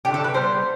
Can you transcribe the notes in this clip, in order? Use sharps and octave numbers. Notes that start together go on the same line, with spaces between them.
D3 A3 D4 G4
A4
B4
D3 G3 B3 C5